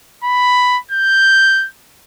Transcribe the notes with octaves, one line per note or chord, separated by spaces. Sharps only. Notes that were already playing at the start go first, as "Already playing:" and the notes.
B5
G6